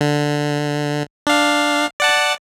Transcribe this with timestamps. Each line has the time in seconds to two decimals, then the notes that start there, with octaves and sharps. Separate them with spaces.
0.01 D3
1.27 D4 F5
2.00 D5 F#5 A5